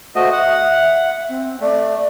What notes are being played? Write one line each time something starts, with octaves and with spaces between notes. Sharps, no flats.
A3 F#4 C5 D#5
E5 F#5
C4
A3 D5